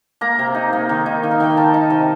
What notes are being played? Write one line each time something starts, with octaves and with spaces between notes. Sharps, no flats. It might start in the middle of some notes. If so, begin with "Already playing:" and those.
A#3 A#5
C3
D#4
A#3
D#3
D#4
D#3
F5
D#3 G5
D#3 A5
D#4
C3